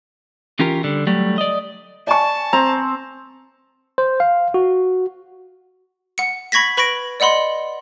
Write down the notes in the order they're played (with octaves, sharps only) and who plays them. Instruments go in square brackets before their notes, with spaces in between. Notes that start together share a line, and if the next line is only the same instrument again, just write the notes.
[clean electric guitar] E3 C#4 F4 G4 A#4
D3 G3
F#3 G3 A3
D5 D#5
[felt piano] D5 G#5 C#6 [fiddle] A5
[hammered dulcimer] C4 [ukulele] A#5
[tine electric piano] C5
F5
F#4
[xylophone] F#5 C#7
B5 C#6 G#6 A#6 B6
B4 B5 C#6 A#6 D7
D5 D#5 F#5 B5 C6